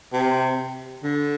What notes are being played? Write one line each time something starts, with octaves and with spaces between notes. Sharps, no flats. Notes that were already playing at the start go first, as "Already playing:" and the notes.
C3
D3